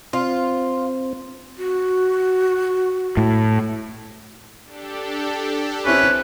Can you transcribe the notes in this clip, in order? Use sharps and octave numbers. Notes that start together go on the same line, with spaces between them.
C4 F4
F#4
A2
D4 G4 A4
C4 C#4 E4 B4